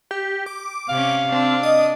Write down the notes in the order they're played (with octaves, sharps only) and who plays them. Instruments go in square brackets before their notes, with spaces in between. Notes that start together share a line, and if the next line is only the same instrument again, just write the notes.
[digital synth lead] G4
D6
[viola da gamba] C3 C#4 [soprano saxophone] F5
[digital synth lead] C4 [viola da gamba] D4
[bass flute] D#5 [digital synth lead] D#6